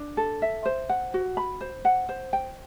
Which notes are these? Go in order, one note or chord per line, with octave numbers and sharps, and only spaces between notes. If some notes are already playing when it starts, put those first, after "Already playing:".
Already playing: D4
A4
E5
C5
F#5
F#4
B5
C5
F#5
C5
G5